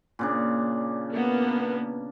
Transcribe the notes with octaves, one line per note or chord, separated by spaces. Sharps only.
A#2 C#3 D4
A#3 B3